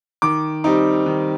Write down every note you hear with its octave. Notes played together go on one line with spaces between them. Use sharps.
D#3 D6
G3 C4 D#4
D#3